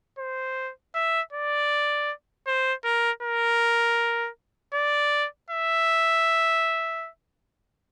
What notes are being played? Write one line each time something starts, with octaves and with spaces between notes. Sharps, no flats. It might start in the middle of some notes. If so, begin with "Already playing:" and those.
C5
E5
D5
C5
A#4
A#4
D5
E5